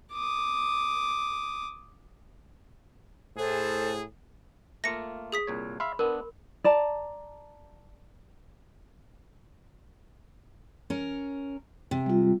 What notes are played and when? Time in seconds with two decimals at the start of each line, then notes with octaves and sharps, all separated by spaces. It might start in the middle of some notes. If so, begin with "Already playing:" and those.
0.13 D6 D#6
3.37 A2 G#4 A4 C5 F#6
4.84 A3 A#3 F4 A#6 C#7
5.32 G#4 D#6 B6
5.47 C2 A#2 C#5
5.80 E5 F5 B5 C6
5.99 B3 D4 A#4
6.64 D5 A5 A#5
10.90 C#4 A#4
11.91 C3
12.06 G3 F4